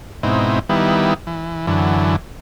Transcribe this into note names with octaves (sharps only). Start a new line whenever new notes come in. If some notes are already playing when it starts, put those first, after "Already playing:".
G#2 B2 C4 D#4 E4
D#3 G3 B3 E4
E3
F#2 D3 E3